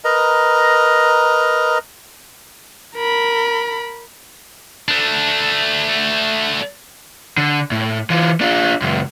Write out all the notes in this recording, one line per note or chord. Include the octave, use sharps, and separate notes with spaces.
A#4 B4 D#5 A#5
A#4 B5
A3 D4
D3
A2
E3 F4
D4 F4
C#2 F#2